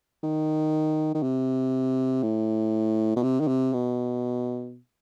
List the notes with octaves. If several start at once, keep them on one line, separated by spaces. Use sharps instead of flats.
D#3
D#3
C3
A2
B2
C3
D#3
C3
B2